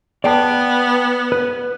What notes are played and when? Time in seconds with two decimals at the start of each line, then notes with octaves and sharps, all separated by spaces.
0.24 B3 D5 G5 A5
1.32 B4